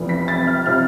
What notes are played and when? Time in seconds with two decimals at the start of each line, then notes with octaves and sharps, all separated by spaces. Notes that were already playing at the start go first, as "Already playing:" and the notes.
Already playing: F1 F2 E3 B3
0.09 B6
0.28 A6
0.47 F6
0.66 C3 F3 C4 F6